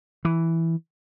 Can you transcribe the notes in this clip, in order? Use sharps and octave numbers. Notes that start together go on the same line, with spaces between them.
E3